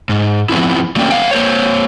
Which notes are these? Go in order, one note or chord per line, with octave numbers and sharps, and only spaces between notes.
G#2
F3 B3 C4 E4
F#3 A3 A#3 C#4 D5 G5
B3 F5 G5
A#3 C5 C#5